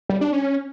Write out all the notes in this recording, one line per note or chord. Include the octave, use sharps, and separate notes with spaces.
G3
D4
C#4